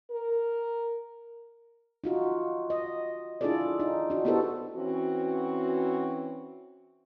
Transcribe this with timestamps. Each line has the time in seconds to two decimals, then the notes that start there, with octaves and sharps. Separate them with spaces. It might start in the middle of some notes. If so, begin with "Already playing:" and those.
0.11 A#4
2.04 D#4 F4 F#4
2.70 D#5
3.41 D4 E4 F4 G#4 A4 D5
3.80 D#4
4.10 D4 F#4
4.25 B3 E4 F#4 G4 A4 C5
4.76 E3 C4 C#4 F#4